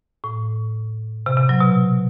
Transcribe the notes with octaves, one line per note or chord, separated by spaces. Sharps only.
A2
C3
C3
F#3
B2